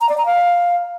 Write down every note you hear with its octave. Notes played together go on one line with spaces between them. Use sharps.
A#5
D5
A#5
F5